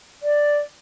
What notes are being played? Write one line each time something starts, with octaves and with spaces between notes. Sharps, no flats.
D5